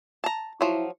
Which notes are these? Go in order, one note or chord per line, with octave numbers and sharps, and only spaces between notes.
A5 A#5
F3 F#3 E4